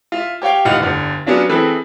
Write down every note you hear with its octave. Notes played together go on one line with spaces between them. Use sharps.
F4 E5
G4 C#5 F5 G5
D#1 A1 D#4 F4 F#5 F6
G1 D3
F#3 B3 C#4 D4 F4
E3 C4 G#4 A4 B4